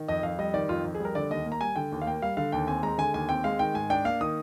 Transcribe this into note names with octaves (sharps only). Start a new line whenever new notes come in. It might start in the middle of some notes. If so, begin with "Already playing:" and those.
Already playing: D#3
F2 D#5
F2 F5
G3 D#5
D#3 D5
F2 F4
F2
G#4
G3 A#4
D3 D5
D#2 D#5
A#3
A#5
G3 G#5
D3 G5
D#2
F5
A#3 G5
G3 F5
D3 F5
D#2 G5
C4 G#5
G#3 A#5
D3 G#5
D#2 G#5
C4 G5
G#3 F5
D#3 G5
G#2 G#5
D4 G5
A#3 F5
D#3 D#6